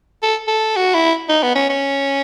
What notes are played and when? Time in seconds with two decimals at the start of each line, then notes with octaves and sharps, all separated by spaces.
0.23 A4
0.47 A4
0.76 F#4
0.94 E4
1.29 D#4
1.43 B3
1.55 C#4
1.69 C#4